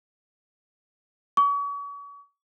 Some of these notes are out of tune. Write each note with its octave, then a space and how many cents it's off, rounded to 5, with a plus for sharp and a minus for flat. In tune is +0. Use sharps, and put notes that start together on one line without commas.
C#6 +40